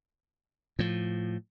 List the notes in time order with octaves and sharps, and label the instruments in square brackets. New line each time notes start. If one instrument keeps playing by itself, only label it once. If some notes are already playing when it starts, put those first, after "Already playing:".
[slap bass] A2 F3